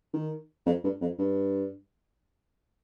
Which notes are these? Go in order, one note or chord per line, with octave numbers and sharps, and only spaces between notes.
D#3
F2
G2
F2
G2